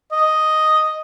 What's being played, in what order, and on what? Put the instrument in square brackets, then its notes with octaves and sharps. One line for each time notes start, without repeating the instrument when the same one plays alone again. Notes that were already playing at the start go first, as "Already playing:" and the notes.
[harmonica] D#5